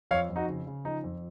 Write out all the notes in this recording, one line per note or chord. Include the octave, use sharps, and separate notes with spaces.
F2 C#5 F5
F2
D#4 F#4
C#3
C#3
F3 D#4
F2